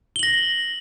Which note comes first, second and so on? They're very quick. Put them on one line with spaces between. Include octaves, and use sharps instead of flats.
G7 F#7 A#6